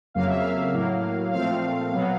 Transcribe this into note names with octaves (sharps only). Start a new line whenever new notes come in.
F2 C#3 F#3 A#3 F5
E5
F5
A2 F#3 A#3
A#2 F3 A3 C4 F5
B2 F#3 B3